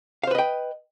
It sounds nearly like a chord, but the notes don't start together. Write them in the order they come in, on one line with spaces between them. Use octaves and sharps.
F5 C5 B4 D#5 G5